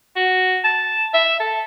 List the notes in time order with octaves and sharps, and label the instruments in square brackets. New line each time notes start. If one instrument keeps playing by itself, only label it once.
[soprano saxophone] F#4
A5
E5
A4